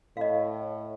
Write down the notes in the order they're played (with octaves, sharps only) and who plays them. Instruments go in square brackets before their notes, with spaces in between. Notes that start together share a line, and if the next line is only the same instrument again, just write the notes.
[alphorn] A2 [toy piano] D#5 F5